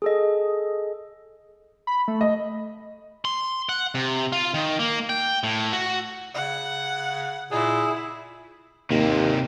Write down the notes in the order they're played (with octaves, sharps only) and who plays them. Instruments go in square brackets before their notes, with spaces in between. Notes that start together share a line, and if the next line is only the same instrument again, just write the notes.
[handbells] G#4 A4 D#5
[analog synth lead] B5
A3
[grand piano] D#5
[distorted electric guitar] C6
F#5
C3
F4
D#3
A#3
G5
A2
F#4
[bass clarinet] C#3 [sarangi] F#5
[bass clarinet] A#2 [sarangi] E4 [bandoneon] G#4
[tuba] D#2 [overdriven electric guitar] C3 A#3